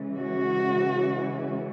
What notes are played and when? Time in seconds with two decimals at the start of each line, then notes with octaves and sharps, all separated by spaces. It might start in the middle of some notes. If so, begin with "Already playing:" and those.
Already playing: C#3 E3 G#3 C#4
0.18 F#4